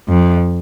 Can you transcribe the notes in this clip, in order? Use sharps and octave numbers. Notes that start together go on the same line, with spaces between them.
F2